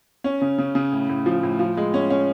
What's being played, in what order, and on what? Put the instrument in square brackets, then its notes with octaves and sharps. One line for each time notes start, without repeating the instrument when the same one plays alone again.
[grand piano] C#4
C#3
C#3
C#3
A2
A2
F3
A2
F3
G#3
C#4
C#4